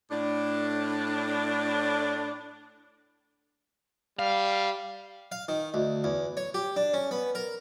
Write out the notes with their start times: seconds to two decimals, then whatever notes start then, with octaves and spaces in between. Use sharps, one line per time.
0.11 A2 D4
4.19 G3 F5
5.32 F5
5.48 D#3
5.74 D2
6.04 E2
6.37 C#5
6.54 G4
6.76 D4
6.94 C#4
7.11 B3
7.35 A#4